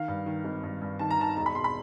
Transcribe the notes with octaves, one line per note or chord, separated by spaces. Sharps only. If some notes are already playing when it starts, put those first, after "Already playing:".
Already playing: D#3 F5
G2
D#3
G#1
G2
G2
D#3 A5
A#5
D#3 A5
E1 A#5
B5
E1 C6
B5